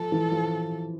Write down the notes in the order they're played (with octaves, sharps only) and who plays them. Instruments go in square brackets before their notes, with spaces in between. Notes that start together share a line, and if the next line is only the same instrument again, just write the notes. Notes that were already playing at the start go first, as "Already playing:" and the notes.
Already playing: [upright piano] F3 [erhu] A4
[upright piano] E3
F3